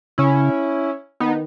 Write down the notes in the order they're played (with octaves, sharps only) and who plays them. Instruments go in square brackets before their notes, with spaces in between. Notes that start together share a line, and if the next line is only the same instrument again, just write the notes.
[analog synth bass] C#3 [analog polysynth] C#4 E4
[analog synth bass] D#3 [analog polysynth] B3 D#4